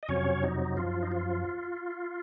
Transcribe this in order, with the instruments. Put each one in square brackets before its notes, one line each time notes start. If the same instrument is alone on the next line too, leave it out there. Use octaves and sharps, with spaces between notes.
[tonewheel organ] D#5
F2 C3 F#3 C#4 C#5
D#4
F#2 F3 F4
D#4
F4